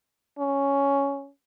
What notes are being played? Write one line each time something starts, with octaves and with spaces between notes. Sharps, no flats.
C#4